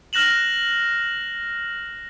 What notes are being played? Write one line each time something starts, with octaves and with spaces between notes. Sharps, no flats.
F6 F#6 A#6 E7 F#7